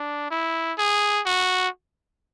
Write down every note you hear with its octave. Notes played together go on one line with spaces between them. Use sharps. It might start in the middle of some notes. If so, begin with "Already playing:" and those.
Already playing: D4
E4
G#4
F#4